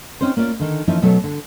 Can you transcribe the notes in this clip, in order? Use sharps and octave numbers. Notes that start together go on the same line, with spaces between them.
C4 C#4 D#4 C5
A#3 C#4 F4 D5
D3 D#3 D#4
E3 F3 A#3 C#4 D#4 E4
B2 F#3 A3 A4 C5 C#5
D3